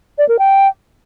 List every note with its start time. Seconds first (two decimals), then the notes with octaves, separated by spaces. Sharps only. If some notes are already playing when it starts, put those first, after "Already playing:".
0.18 D5
0.29 A#4
0.39 G5